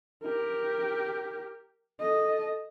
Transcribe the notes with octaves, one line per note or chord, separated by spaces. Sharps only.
G4 A#4
A4 D#5